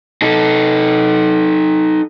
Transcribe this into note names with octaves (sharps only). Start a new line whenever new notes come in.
D#4 A4